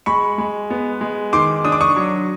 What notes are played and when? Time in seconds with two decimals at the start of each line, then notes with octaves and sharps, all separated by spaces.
0.06 G#3 B5 C#6
0.38 G#3
0.70 B3
1.01 G#3
1.33 D#3 C6 D6
1.65 D4 D#6
1.72 D6
1.81 C#6 D#6
1.96 F#3